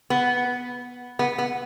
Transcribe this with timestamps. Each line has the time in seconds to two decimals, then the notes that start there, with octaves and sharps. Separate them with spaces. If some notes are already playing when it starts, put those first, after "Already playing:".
0.10 B3
1.19 B3
1.38 B3